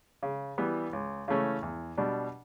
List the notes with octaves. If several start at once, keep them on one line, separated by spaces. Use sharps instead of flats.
C#3
E3 G3 B3
C#2
C#3 E3 A3 C#4
E2
B2 G3 D4